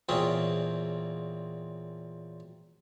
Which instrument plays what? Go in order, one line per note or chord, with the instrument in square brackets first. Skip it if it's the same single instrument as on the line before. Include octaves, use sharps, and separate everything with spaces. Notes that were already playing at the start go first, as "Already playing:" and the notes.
[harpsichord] E2 A#2 C4 C#4 G#4